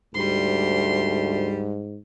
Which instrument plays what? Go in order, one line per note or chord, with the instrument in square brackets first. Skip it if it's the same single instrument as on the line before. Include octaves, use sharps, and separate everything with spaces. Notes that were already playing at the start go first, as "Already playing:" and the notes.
[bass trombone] D2 [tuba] G#2 [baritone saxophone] G3 [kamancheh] C6